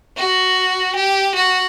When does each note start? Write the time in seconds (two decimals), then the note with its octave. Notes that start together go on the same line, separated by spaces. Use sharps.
0.17 F#4
0.95 G4
1.35 F#4